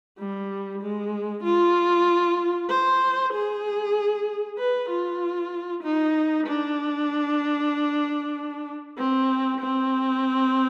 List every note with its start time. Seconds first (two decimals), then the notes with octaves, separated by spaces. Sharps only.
0.19 G3
0.82 G#3
1.44 F4
2.69 C5
3.33 G#4
4.58 B4
4.90 F4
5.84 D#4
6.46 D4
8.98 C4
9.60 C4